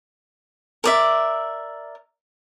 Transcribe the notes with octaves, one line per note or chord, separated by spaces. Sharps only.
A#4 D5 E5